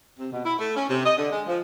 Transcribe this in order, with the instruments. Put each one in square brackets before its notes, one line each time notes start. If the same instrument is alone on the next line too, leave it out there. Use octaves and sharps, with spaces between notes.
[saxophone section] C3
B2
E4
A3
C#4
C3
D#5
D3
G#3
F3